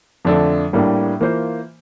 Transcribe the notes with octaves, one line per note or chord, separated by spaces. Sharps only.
F2 D3 A3 D4 A4
A2 G3 A#3 D4
E3 A#3 F4 C5